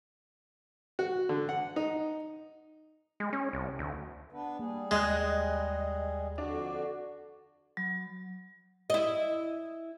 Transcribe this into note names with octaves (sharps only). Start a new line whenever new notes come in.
F#4
D3
F#5
D#4
G#3
C#4
C2
D2
B3 D4 B4
G3 A#3 G#4
D#2 G#3 D#5 F#6
F2 D3 D4 F#4
F#3
E4 D#5